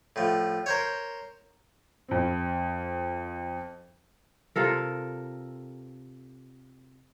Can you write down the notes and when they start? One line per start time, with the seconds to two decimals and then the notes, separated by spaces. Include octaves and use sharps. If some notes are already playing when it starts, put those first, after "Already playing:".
0.16 A2 F3
0.66 A#4 C5 C#5
2.09 F2 C4
4.56 C3 F4 A4 A#4